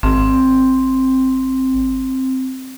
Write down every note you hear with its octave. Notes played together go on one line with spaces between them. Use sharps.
G#1 C4